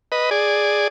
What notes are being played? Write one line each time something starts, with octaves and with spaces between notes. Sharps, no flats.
B4 D#5
G#4 D5